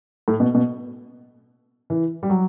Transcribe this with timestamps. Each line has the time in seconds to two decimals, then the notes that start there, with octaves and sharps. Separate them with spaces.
0.28 A2
0.40 B2
0.55 B2
1.90 E3
2.23 G3
2.30 F#3